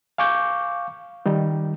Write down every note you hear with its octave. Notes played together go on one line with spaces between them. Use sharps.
F5 G#5 C#6 D6 G6
D#3 G3 D#4